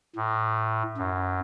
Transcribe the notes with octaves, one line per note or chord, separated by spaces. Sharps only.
A2
F#2